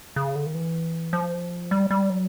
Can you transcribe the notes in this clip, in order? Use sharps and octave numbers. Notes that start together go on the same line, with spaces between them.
C#3
D3
D#3
E3
F3
G3
G3
F#3